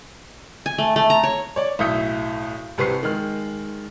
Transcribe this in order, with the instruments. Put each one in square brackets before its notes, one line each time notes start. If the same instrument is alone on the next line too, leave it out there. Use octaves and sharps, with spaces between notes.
[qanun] G#5
A3
A3
A#5
C#5
[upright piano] C#5 D5
B1 A2 E5 D#6 G6 C#7
C2 C3 B4 C#6 C7
D#3 G#3 F6